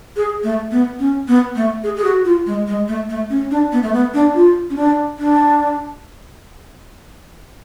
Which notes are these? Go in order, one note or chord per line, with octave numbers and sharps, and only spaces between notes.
G#4
A3
B3
C#4
B3
A3
G#4
G#4
F#4
F4
G#3
G#3
A3
A3
C#4
D4
B3
A3
B3
D4
F4
C#4
D4
D4